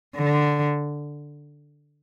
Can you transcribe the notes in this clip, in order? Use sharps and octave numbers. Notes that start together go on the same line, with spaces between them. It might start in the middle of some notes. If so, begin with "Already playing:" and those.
D3